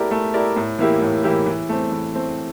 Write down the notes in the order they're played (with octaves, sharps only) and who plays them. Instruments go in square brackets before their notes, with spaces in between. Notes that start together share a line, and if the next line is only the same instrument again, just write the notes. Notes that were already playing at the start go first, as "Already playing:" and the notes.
Already playing: [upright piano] A3 E4 G4 A#4 D5
A3
E4 G4 A#4 D5
A2
E3 A#3 E4 G4
A2
E3 A#3 E4 G4
E3
A3 C4
E3
A3 C4